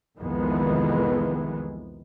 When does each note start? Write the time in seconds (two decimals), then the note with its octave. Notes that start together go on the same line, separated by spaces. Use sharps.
0.19 C2 F2 D#3 E3 G#3 B3